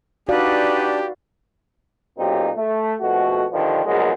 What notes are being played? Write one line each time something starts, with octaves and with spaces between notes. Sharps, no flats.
D4 D#4 F#4 G4 B4 D5 F5
B1 F#2 A#2 C4 D#4 G4
A3
F2 G#2 B2 A3 F#4
G2 D3 D#3 F3 G3
A#1 E2 F#3 G#3 A#3